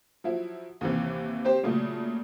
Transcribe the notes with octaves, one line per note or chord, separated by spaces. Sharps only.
F3 F#3 E4
D#2 C3 E3
C4 G4 C5
A#2 C#3 F#3 A3